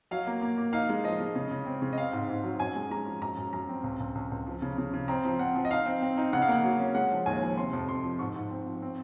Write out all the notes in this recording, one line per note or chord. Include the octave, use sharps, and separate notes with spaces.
F#3 F5
A#3
A#3
A#3
D#4 F5
G#3
F3 D#5
G#3
C#3
C#3
C4
C#3
D#5
C4 F5
G#2
G#2
F#3
F#2 G#5
G#3
G#3 A#5
F3
F#2 A#5
F#2
F#2 A#5
C4
C#2
C#2
C#2
C#2
F3
C#3
C#3
C#3
C4 A#5
F3
C4 F#5
F3
D#5
D#4 F5
C4
C4
D#4
C#3 F#5
F5
A#3 F#5
F#3
C#4
G#3 F#5
F3
D#2 G#5
F3
C3 C6
F2
F2 C6
F3
G#2 C#6
G#2
C4
F3
C4